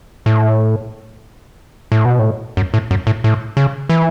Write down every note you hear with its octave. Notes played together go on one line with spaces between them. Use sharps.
A2
A2
B2
A2
F#2
A2
F#2
A2
A2
C#3
E3